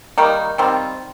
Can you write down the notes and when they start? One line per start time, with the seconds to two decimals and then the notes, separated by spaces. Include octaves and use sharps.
0.18 D#3 G3 A#3 D#4
0.58 D#3 G3 C4 F4